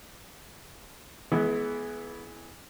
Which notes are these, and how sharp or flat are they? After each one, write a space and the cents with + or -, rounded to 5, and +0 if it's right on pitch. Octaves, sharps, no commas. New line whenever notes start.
E3 +0 G#3 +35 B3 -5